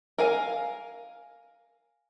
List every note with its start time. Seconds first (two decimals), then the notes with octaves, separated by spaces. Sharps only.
0.18 A#4 F5 G#5